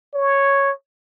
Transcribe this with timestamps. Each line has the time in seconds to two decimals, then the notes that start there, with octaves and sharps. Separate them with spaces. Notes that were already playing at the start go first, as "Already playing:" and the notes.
0.14 C#5